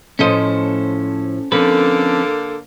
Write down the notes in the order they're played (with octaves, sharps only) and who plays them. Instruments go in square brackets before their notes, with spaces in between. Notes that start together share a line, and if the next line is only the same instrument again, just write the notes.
[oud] A2 F3 D#5 [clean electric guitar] C#4 A4 C5
[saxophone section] D3 A#3 A4 [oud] F3 [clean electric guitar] C4 C#4 B4